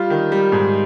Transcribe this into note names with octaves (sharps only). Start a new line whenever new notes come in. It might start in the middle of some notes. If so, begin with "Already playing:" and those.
Already playing: G3 F4
D#3
G3
G#2